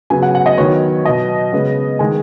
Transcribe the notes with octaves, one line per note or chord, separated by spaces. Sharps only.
C#3 F#3 B3 G#5
F#5
F#5
D#5
D#3 F#3 B3 C#5
B2 F#3 B3 D#5
C#3 G#3 B3
D#3 G#3 B3 G#5